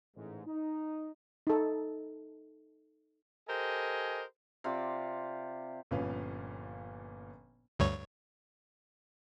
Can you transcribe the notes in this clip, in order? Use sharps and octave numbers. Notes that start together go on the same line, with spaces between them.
A1 G#2
D#4
D#4 A4
G4 A4 A#4 C5 D#5 G#5
C3 F4 D5 D6
G1 A#2 F3 C#4 B4 F5
D2 G2 C#5